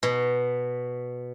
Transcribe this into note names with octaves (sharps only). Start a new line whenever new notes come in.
B2